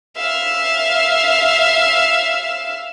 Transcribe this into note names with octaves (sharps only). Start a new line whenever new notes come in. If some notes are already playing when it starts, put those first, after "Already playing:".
E5 F5